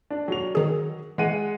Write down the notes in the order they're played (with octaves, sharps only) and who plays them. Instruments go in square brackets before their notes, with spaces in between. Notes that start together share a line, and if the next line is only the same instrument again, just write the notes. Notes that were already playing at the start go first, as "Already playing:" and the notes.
[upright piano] D4
F#3 F7
[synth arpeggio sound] D#3 G#4
[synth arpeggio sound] E3 [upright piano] G#3 F#5 D#7